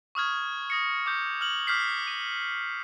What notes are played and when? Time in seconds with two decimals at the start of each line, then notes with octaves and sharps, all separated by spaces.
0.15 C#6 D#6 F6 G#6
0.70 D#6 A#6 C#7
1.06 D6 G6
1.41 F6 F#7
1.67 D6 F6 G6 B6 C7
2.07 D#7